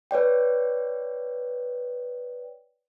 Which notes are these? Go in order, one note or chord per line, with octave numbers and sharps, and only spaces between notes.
B4 C#5 D5 G5